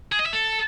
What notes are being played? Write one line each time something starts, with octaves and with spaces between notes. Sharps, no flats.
G#4
D#5
E5
A4